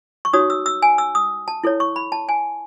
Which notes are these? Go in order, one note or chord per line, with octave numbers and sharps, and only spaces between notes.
C#6
D#4 F#4 C#5 D#6
E6
E6
G#5
E6
D#6
A5
E4 A4 C#5
C#6
B5
A5
G#5